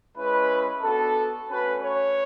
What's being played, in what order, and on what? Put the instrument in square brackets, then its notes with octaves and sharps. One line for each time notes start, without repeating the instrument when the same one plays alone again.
[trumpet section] G#3 C#4 E4 B4
B3 D4 F#4 A4
A3 C#4 F#4 B4
C#5